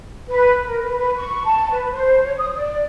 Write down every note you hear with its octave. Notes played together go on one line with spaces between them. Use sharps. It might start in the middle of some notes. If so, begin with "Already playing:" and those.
B4
A#4
B4
B4
C#6
A5
B4
C5
C#5
D#6
D5